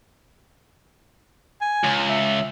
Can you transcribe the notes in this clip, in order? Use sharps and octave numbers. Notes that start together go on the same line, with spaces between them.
G#5
C#2
E5